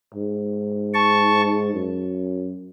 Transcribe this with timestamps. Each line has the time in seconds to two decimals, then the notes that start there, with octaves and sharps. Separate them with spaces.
0.15 G#2
0.94 A5 C#6
1.73 F#2